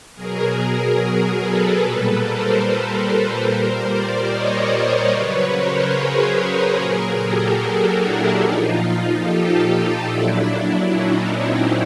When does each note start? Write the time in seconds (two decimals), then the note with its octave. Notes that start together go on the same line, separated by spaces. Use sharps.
0.14 B2 F#3 G#4 A#4
1.37 A4 B4
1.80 A#2 G3
2.20 A#4 C5
3.03 A#4 C5
3.44 A#2 G3
3.85 C5 D5
4.27 C#5 D#5
4.68 C5 D5
5.09 C#3 F#3 B4 C#5
5.51 A#4 C5
5.92 G#4 A#4
6.75 A#2 F#3
7.15 G4 A4
7.57 F#4 G#4
7.98 D4 E4
8.39 A#2 F3 D#4 F4
9.22 G4 A4
10.04 A#2 F#3 D4 E4
10.87 C#4 D#4
11.29 C4 D4